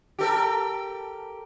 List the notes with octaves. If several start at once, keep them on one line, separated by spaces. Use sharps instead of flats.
G4 A4 A#4